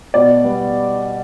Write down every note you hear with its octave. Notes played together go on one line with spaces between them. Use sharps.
B2 D5
G3 B3